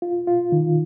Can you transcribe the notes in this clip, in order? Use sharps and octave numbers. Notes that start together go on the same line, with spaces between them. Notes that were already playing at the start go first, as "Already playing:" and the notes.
F4
F4
D#3